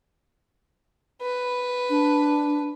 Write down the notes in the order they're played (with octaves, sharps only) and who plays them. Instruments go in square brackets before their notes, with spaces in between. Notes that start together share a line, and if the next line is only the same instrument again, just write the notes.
[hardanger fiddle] B4
[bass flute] D4